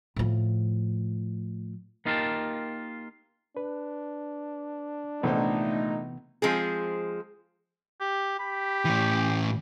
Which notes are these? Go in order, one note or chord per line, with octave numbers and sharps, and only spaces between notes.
A2 F3
A#3 D#4 F4 G4 A#4 A5
D4 B4
A#1 C3 E3 A3 B3 D#4 A4 C5
F3 G#3 C4 G#4
G4
G4 B5
A2 E3